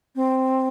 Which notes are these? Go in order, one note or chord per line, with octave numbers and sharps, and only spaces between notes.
C4